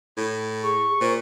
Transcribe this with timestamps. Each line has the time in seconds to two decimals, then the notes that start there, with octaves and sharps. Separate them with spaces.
0.17 A2
0.63 G#4 C#6
1.00 A#2 C5